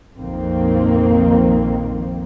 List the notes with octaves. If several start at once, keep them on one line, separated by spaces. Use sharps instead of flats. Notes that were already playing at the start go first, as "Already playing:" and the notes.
A#1 F2 D#3 A#3 C4